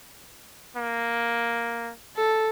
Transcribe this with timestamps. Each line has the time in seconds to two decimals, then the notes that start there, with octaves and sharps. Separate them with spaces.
0.76 A#3
2.17 A4